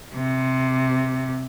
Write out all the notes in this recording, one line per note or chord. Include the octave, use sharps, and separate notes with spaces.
C3